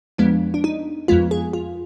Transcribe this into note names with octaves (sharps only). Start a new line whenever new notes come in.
F2 F3 G#3 B3 D4
D4
D#4
F2 F3 G#3 B3 F4
G#4
F4